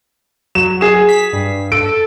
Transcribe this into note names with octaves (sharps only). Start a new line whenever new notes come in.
F#3 E7
G#4 E7
B6
G2
A4 D7